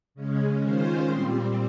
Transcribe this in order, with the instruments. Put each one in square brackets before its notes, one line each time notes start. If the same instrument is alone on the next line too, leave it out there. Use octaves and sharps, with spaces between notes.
[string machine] C#3 G#3 C#4
D#3 G#3 C#4 F4 C5
A#2 G3 C4